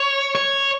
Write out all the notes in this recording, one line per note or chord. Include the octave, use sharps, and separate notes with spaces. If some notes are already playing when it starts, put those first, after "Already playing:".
Already playing: C#5
C#5